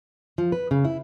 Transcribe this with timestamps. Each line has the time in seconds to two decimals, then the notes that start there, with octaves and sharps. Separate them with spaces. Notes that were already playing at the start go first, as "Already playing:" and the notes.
0.38 F3
0.52 B4
0.71 C#3
0.85 E4